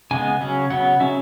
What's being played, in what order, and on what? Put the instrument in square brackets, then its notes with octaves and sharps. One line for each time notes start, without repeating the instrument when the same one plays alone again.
[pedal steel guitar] C#3 G#3 B3 G#5
C#3 F#3 C#4
C#3 F#3 B3 F#5
C#3 F#3 C#4 E5